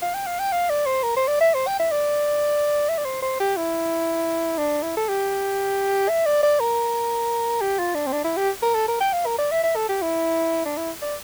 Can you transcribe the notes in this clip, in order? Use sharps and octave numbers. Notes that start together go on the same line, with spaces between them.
F5
G5
F5
G5
F5
D5
C5
A#4
C5
D5
E5
C5
G5
E5
D5
E5
D5
C5
C5
G4
E4
D4
E4
A4
G4
E5
D5
D5
A#4
G4
F4
D4
C4
D4
E4
G4
A#4
A4
A#4
G5
F5
A#4
D5
E5
E5
A4
G4
E4
D4
E4
D5